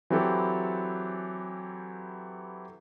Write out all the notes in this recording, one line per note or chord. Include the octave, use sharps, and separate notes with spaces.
E3 F#3 C4 E4 G4 A4